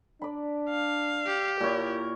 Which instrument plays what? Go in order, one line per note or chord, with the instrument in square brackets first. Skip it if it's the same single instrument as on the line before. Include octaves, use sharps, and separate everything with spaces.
[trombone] D4 [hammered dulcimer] D5 B5
[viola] F5
[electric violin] G4
[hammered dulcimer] A#2 E4 C#5 [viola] A#4